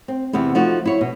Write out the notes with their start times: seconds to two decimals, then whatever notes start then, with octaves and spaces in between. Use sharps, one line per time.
0.08 C4
0.33 E2 C3 B3 E4
0.55 F3 A3 D#4 F4 F#4
0.85 E4 C#5
1.01 B2